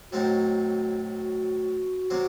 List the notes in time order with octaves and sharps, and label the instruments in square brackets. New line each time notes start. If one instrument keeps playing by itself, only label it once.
[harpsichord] A2 F#3 C4 D#4 [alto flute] F#4
[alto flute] F#4
[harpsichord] C3 F#3 C4